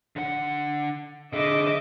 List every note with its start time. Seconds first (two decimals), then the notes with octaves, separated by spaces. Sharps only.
0.16 D3 F#5
1.33 D3 G#4 D#5 E5 D6